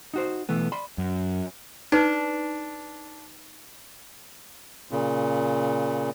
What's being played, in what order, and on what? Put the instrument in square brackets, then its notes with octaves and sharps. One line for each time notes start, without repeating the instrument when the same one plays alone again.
[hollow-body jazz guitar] D#4 F#4 C5
B1 E3 A3 B3
D5 B5 C6
[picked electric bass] F#2
[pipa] D4 [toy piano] D#4 B4
[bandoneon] A#2 C#3